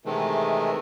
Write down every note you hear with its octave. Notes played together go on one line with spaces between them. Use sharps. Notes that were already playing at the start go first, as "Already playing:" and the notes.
C3 D#3 E3 G#3 A3